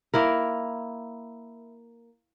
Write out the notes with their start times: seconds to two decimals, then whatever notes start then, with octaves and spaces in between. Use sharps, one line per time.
0.14 A#3 E4 A#4